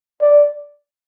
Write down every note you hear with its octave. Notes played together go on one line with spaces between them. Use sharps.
D5